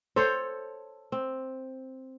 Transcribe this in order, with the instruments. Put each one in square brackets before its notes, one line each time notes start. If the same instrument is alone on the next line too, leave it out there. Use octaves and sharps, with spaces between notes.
[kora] A4 C#5 [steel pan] C5
[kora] C4